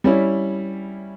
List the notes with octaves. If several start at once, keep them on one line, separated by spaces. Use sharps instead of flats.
G3 C#4 E4